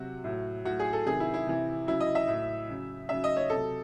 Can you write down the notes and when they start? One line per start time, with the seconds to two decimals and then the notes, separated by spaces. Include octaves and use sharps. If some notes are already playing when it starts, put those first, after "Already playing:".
Already playing: C3 F#3 F#4
0.24 A2 F#3
0.65 A2 F#3 F#4
0.79 G#4
0.93 A4
1.05 C3 D#3 F#3 G#4
1.20 E4
1.34 E4
1.47 C3 E3
1.87 C#3 F#3 E4
2.00 D#5
2.15 E5
2.28 A2 F#3
2.69 C#3 F#3
3.09 C#3 F#3 E5
3.24 D#5
3.37 C#5
3.50 C3 F#3 A4